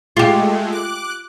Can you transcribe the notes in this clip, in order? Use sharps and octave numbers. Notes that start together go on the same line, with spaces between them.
G#3 A3 F4 G4
D6 F#6